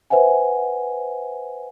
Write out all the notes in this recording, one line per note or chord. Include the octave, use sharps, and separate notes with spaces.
B4 C5 E5 F#5 G#5